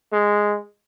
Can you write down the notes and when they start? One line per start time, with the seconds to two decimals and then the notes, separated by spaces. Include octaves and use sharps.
0.12 G#3